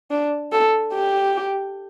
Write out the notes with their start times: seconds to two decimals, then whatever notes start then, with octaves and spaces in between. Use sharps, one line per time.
0.11 D4
0.52 A4
0.93 G4